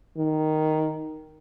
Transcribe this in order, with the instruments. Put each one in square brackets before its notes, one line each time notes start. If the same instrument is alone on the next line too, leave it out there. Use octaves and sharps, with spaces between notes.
[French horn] D#3